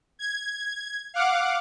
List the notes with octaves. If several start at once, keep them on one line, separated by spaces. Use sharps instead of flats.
G#6
F5 F#5 D6